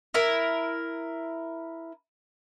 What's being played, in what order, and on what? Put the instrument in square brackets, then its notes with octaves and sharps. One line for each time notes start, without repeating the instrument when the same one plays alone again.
[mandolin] E4 A#4